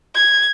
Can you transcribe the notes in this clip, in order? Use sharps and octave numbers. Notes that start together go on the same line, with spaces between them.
G#6